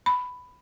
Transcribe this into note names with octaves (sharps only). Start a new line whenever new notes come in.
B5